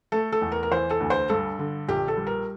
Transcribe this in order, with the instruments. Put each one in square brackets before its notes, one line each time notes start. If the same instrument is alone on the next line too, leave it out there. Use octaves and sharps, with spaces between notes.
[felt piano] A3 A4
A4
E2
A#4
A#4
E3 C5
A4
D2
C5
G2 A4
D3
A#1 G4
A4
G3
A#4